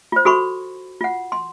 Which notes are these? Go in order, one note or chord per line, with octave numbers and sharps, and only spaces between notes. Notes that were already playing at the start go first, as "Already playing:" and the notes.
F4 C5
F#4 A4 B5 C#6
F4 F#5
C6